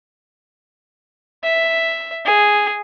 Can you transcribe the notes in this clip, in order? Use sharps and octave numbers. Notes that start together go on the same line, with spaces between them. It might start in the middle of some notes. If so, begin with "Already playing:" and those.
E5
G#4